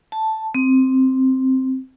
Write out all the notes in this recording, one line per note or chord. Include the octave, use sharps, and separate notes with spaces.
A5
C4